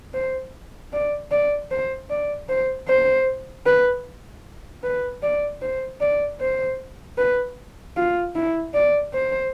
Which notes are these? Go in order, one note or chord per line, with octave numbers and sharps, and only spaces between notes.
C5
D5
D5
C5
D5
C5
C5
B4
B4
D5
C5
D5
C5
B4
F4
E4
D5
C5